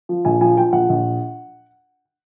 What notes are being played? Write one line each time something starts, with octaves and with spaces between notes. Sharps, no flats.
F3
A#1 G#5
F3 G#5
F3 G5
A#1 F#5
A#1